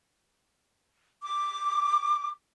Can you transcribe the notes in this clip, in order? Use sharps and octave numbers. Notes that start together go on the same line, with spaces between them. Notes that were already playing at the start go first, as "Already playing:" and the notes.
D6